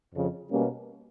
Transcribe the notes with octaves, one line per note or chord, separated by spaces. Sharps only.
F2 C#3 F3
B2 G3 A#3 C#4